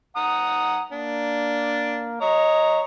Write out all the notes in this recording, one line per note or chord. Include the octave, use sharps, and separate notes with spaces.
F#5 A#5 D#6
A#3 D4
C#5 D#5 A#5